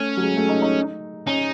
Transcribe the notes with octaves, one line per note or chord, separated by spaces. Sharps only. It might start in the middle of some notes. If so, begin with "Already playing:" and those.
Already playing: A3 C#4
F#3
G#3
A3
D#4
D#4
C#4 D#4